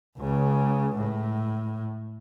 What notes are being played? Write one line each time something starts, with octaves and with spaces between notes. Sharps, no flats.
C#2 C#3
A2